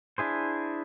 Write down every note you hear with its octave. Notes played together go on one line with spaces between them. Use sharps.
D4 E4 G#4 C5